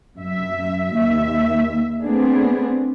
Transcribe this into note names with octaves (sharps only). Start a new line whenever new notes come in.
F#2 E5
D#2 E5
A3 B3 C4 D4 G#4